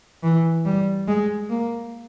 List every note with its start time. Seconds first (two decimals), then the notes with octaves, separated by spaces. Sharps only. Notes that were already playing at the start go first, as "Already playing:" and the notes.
0.23 E3
0.65 G3
1.08 G#3
1.50 A#3